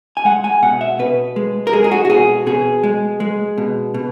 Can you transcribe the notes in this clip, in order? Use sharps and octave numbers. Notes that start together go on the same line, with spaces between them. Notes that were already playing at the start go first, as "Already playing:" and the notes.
G#5
G#3 F#5
G#5
B2 F#5
E5
B2 B4
G#3
A#4
G#3 G#4
G#4
F#4
F#4
B2 G#4
B2 G#4
G#3
G#3
B2
B2